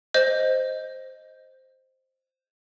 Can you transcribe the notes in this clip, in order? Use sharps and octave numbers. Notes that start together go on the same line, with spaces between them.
C5 D#5 G6